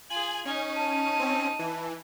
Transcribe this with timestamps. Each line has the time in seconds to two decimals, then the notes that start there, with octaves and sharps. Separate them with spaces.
0.10 F4 G#4 G#5 F#7
0.45 C#4 D#4 G#5
0.76 A5 D#7
1.19 C4 C#4
1.59 E3